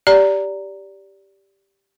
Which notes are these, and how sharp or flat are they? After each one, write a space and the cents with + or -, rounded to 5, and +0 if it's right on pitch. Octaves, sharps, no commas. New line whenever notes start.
G4 +0 D5 -20 A#5 -10